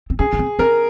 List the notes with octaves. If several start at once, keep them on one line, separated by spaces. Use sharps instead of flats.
C4
C#4 G#4
C#4
C4
C4 A#4